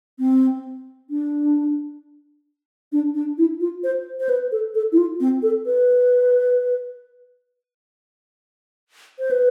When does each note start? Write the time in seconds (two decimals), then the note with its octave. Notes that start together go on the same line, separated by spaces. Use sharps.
0.19 C4
1.10 D4
2.92 D4
3.15 D4
3.38 E4
3.60 F4
3.84 C5
4.20 C5
4.29 B4
4.52 A4
4.75 A4
4.92 E4
4.98 F4
5.20 C4
5.42 A4
5.66 B4
9.19 C5
9.31 B4